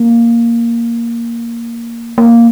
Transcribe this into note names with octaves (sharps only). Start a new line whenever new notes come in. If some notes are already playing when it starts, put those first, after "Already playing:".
Already playing: A#3
A#3